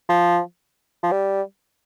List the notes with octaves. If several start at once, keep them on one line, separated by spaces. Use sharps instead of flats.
F3
F3
G3